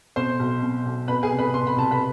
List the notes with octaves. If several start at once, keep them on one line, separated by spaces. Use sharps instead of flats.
B2 C5 C6
B1
B2
B1
B2 B4 B5
G#4 G#5
C2
B4 B5
B2 C6
B5
C2 A5
B4 B5